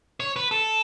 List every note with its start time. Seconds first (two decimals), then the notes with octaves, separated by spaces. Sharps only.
0.20 C#5
0.36 B4
0.51 A4